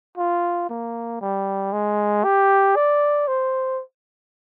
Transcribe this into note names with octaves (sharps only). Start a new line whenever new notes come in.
F4
A#3
G3
G#3
G4
D5
C5